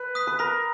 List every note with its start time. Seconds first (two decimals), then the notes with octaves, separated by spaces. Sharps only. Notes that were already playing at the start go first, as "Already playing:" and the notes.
Already playing: B4
0.15 D#6 F#6 B6
0.27 B4
0.39 A#4 B5